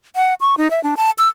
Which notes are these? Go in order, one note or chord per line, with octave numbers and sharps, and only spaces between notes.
F#5
C#6
D#4
E5
D4
A5
E6